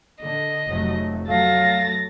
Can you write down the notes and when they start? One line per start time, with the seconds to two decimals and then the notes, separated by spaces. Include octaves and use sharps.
0.22 D3 D#5
0.68 F1 F#3 A3
1.29 F#3 A3 F5 A6 A#6